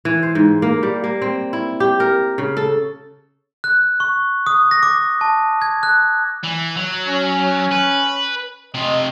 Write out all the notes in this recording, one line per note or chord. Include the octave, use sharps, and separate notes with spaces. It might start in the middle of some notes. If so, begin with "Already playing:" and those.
E3
C5
G#2
A#3
G3
A#3
C4
E4
G4
A#4
C#3
A4
F#6
C#6
D#6
A#6
D6
A5
G#6
F#6
E3
F#3
C#4
B4
C3 F4 D#5